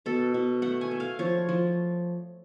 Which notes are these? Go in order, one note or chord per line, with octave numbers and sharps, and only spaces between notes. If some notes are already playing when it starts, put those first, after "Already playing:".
B2 A4
B2
A3 F#5
G#5
A3
F5
F3 C#5
F3